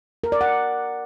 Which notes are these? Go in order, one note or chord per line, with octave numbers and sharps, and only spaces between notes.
A#4
D5
F#5